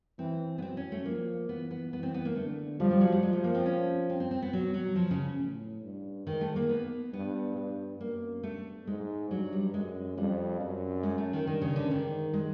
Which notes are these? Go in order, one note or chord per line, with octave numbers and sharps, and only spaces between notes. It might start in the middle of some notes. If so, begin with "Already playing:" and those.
E3 C4
B3
F#3 C4
C#4
A3
F3 A#3
E3 B3
B3
E3 B3
C4
B3
A#3
D3 A3
F3 G3
G3
F#3
G3
F3 G#3
A3
A#3
C4
C#4
C4
C4
C4
B3
B2 F#3
F#3
F3
C#3
A2
G2
G#2 D#3
A3
A#3
B3
G2 B3
G2
F#2 A#3
G2 A3
G#2 G#3
G2 F#3
G3
F#2 G#3
F2 G3
F#2
G#3
A3
D#3
G2 D#3
C#3
D3
G#2 D#3
G#3